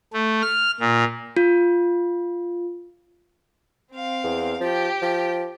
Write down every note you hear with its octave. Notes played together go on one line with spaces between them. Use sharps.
A3
F6
A#2
F4
C4 F5
E2
F3 G4
F3